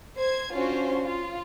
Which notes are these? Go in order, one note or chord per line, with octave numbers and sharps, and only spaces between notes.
C5 G#6
C#4 D4 F4 F#4 C5
F4